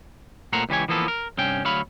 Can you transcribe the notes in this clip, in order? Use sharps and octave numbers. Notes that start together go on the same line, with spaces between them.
A#2 A3 A#4 C5 F#5 A#5
C#2 E3 G4 C#5 G#5
E3 F3 A#3 B3 A4
A#4
G2 C3 C#4 G5
D2 F#3 C#5 F5 B5